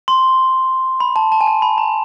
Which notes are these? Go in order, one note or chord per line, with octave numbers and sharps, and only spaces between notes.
C6
B5
A5
A5
G#5
A5
B5
A#5